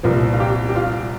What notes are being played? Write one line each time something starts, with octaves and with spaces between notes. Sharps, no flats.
C2 A#2 F3 A#4
F4
G4
G4
F4